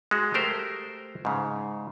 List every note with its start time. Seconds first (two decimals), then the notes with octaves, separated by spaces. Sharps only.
0.11 G#3 F#4
0.34 A3 G4 A#4 C5
1.25 G#2 C#3